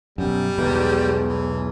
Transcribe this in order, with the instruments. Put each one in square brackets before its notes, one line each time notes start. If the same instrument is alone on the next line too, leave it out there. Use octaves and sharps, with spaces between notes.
[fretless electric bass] F#2 B2 [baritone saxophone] G3
[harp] B1 E2 G#3 [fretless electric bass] B2
[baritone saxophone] E3